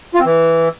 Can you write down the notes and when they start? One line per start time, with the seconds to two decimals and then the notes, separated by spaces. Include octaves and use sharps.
0.14 F4
0.20 C4
0.25 E3